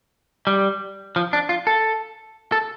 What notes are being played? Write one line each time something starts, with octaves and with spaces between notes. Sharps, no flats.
G3
F3
D4
F4
A4
A4